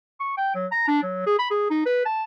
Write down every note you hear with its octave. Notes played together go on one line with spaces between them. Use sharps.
C#6
G5
F#3
A#5
D4
F#3
G#4
B5
G#4
D#4
B4
A5